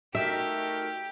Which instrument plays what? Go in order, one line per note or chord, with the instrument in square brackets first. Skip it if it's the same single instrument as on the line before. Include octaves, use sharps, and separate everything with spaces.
[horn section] A3 D#4 A#4 [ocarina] F#4 [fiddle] G4 [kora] E5